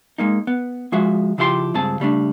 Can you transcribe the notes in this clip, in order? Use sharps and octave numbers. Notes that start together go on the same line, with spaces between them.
G#3 A#3 D#4
B3
F3 G#3 F#4 E5
C#3 F3 E4 G4 F#5 C6
C#2 G2 C4 G#4 A5
C#3 G3 A3 D4